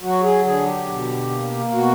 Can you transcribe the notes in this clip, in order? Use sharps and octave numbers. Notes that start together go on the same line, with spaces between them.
F#3 F#4
G#4
D3 G#4
G4
B2
A#3
B2 F#4